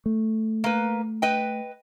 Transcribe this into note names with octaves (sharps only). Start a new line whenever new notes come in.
A3
A#3 B4
B4 D#5 G5